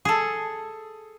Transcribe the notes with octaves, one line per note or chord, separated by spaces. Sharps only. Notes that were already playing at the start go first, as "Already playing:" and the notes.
G#4 A4